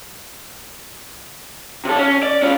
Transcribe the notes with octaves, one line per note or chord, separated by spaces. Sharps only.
C3 A4
C#4
D5
C#4 F4